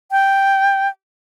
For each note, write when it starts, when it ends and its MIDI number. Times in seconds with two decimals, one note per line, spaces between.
0.11 0.88 79